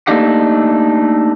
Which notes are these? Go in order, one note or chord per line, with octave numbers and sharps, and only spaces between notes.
A3 A#3 D4 D#4 G4 F#5